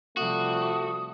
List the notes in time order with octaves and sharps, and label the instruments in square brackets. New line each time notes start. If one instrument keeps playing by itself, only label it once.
[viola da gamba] C3 F3 G3 [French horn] A3 [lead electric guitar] F#4 [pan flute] D#6